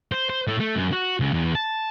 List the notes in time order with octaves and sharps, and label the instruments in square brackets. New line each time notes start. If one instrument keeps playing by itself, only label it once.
[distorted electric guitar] C5
C5
A2
A3
F#2
F#4
C#2
E2
A5